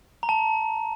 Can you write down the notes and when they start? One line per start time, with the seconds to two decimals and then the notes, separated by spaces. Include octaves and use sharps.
0.23 A#5
0.29 A5